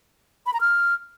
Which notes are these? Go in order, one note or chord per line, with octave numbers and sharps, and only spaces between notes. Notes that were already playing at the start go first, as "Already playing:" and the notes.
B5
A#5
F6